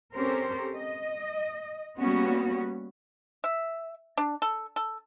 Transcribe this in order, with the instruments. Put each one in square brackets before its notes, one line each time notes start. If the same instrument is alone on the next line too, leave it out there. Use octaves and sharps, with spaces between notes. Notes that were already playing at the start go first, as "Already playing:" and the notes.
[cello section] C4 C#4 G4 A4 A#4 C5
D#5
G3 A#3 B3 C#4 F#4
[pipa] E5
D4
A4
A4